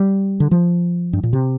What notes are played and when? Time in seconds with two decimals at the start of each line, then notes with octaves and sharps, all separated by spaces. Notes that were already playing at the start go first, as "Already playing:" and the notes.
Already playing: G3
0.40 D3
0.51 F3
1.13 G2
1.23 A#2
1.33 C3